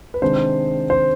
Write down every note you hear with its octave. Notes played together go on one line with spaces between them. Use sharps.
B4
C3 D#3 G#3 D4 C5
C5